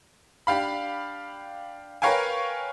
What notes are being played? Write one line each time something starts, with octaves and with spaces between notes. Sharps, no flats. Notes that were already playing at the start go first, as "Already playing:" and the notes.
D4 G4 F5 B5
A#4 B4 C#5 F5 G5 G#5